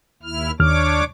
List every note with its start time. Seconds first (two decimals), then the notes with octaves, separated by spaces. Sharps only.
0.23 D#2 E4 F6
0.60 D#2 D4 C#5 D6 F6